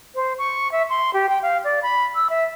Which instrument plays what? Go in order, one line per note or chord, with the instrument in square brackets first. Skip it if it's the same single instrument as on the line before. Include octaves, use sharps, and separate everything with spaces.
[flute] C5
C#6
E5
C6
G4
G5
F5
D5
B5
E6
E5